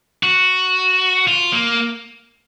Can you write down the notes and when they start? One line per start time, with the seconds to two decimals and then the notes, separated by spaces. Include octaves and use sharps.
0.23 F#4
1.27 F4
1.53 A#3